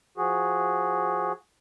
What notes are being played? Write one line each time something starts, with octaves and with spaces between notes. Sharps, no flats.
F3 F#4 G#4